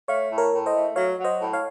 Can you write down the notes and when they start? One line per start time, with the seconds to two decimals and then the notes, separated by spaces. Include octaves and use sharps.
0.08 A3 C#5 F5
0.30 A2
0.38 A#4 C#5
0.52 A2
0.66 C5 D#5
0.74 A3
0.96 F#3 C#5 F5
1.17 F#3
1.24 C5 D#5
1.39 A2
1.53 C#5 F5